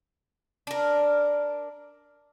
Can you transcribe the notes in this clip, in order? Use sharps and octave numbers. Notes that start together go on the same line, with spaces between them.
D4 A#4